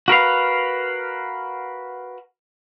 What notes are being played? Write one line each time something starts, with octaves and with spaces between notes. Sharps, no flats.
F#4 A#4 B4 F5